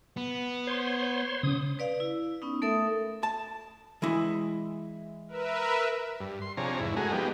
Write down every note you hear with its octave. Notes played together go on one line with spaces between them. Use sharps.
B3
C5 C#5 C6
C#3 C#4 D#6
B4 D5 F5
E4
B3 C#4 D#4
A3 A4 A#4 E5 D#6
A5
E3 G#3 E4
A#4 B4 E5
G2
C6
C3 F3 D4 G#4 C#5 A#5
E2 G#2 E4
G#3 A3 F#4 G#4 A#4
F3 G3 B3 D#4 G4